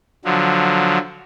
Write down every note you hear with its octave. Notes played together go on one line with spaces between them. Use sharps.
D3 F3 F#3